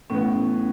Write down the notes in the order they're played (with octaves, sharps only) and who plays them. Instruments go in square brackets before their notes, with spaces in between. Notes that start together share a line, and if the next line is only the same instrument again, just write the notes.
[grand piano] A2 E3 B3 [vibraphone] C#4